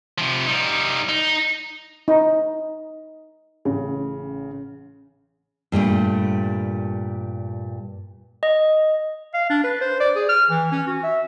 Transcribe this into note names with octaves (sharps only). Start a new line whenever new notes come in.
C3 F3
G3 D#4
D#4
D#4
A1 C#3
G2 A#2 G3 A3
D#5
F5
D4
B4
C5
D5
G#4
F6
E3
C#4
F#4
E5